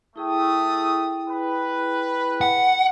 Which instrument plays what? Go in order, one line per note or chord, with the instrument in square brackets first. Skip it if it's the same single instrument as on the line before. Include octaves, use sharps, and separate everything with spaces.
[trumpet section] A3 D#6 [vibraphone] E4 G#4 G5
[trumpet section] B4
[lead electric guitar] F#5